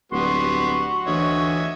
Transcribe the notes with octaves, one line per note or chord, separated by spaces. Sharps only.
D1 G3 B3 F#4 C6
D2 E3 C#5 D#5 E5